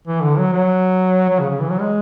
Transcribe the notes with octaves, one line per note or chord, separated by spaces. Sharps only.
E3
D3
F#3
F#3
F#3
C#3
C#3
E3
F#3
G#3